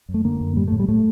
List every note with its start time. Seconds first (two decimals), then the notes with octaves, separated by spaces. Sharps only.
0.09 F#2
0.14 A3
0.24 D3 A#3
0.41 F#2
0.56 A2 G3
0.68 A3
0.72 A2
0.80 G3
0.88 A2 A3